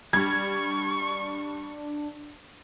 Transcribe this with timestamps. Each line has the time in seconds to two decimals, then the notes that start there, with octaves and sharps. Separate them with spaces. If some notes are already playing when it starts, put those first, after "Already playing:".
0.13 G3 D4 C#6 G#6